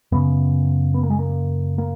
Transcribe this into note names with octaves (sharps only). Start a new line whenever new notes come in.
F#2 C#3 B3
B3
A#3
G#3
A#3
A#3